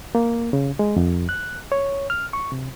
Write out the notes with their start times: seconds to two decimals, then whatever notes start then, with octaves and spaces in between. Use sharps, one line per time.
0.15 A#3
0.53 C#3
0.79 G#3
0.96 F2
1.29 F#6
1.72 C#5
2.10 F6
2.33 C#6
2.52 C3